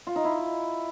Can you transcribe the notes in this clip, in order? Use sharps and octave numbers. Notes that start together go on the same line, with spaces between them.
F4
D#4
E4